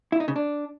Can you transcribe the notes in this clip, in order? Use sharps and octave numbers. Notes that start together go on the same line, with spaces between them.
E4
D#4
C#3
D4